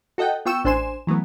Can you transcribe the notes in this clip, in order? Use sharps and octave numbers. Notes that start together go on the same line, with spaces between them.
F#4 A4 D#5 F#5 G5
B3 F4 G5 C#6 E6 E7
A1 D4 C5 G#5 C6 E7
E3 F#3 A3 B3